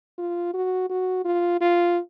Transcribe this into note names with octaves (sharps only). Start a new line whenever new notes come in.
F4
F#4
F#4
F4
F4